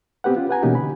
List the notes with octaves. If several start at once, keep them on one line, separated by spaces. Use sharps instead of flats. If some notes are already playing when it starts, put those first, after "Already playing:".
B3 C4 G4 B4 F#5
C#4 F4
B4 F#5 G#5 A#5
B2 E3 A#3 C#4 D#4 G4
D3 B5